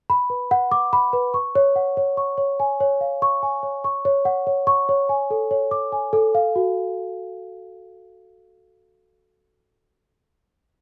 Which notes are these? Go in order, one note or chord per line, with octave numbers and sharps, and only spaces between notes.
B5
B4
F#5
D6
B5
B4
C#6
C#5
F#5
C#5
C#6
C#5
G#5
C#5
F5
C#6
G#5
C#5
C#6
C#5
F#5
C#5
C#6
C#5
G#5
A4
C#5
D6
G#5
A4
F5
F#4